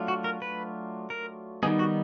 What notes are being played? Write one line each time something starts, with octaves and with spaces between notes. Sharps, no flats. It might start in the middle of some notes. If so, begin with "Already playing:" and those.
Already playing: F#3 A3 D4 F4
F#4
A#4
B4
A#4
D#3 G3 B3 D#4 G#4
F#4